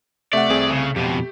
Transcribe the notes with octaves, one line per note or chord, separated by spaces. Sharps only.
C3 A3 D5 F#5
C2 C4 G#4
C#3
F2 B2 G4